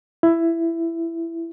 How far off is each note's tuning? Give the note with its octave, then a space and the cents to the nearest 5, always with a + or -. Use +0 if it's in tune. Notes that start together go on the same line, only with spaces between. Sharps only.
E4 +15